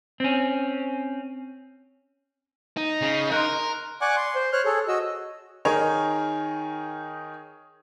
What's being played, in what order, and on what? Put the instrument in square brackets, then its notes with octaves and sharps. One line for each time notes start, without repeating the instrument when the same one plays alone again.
[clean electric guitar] C4 C#4
[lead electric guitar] D#4
[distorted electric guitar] C#3
[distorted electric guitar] A#4 [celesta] C6 F#6
[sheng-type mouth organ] D5 F#5 G#5 C#6 D6 F#6
C6
C5
C5 C#5 F6 F#6
G#4 A4 C#5
F#4 D#5 E6
[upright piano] D#3 D#4 G#4 A#4 C#5